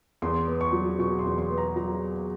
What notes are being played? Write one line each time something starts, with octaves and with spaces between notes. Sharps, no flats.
E2 C6
B3
C#6
F#3
B2 C#6
C6
E2
C6
B3
A#5
F#3 A#5